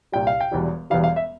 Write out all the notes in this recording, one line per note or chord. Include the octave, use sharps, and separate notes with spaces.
C2 A#2 G3 G5
F5
G5
E1 E2 E3 G3
E1 E2 E3 G3 F5
F5
E5